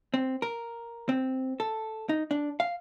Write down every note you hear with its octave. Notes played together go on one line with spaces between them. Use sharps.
C4
A#4
C4
A4
D#4
D4
F5